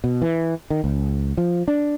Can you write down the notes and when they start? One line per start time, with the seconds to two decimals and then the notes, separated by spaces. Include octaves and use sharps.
0.04 B2
0.22 E3
0.70 D#3
0.84 C#2
1.37 F3
1.68 D4